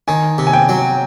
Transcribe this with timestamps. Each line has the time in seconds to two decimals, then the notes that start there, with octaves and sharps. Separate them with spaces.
0.08 D#3 G#5
0.38 C3
0.47 G#5
0.53 G5
0.69 F#3